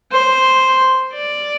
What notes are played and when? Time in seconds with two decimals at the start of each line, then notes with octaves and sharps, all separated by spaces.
0.12 C5
1.13 D5